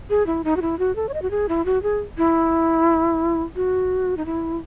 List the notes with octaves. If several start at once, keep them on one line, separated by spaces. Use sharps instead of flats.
G#4
E4
D#4
F#4
E4
F#4
A4
C#5
D#5
F#4
G#4
E4
F#4
G#4
E4
F#4
D#4
E4